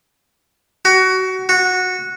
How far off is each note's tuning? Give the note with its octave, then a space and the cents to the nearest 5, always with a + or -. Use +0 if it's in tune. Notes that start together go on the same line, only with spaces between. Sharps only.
F#4 +20
F#4 -15